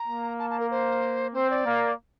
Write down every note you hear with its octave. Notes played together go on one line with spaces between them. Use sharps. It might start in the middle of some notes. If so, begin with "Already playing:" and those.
Already playing: A#5
A#3
A5
A5
A#4
C5
C4 C5
D5
A#3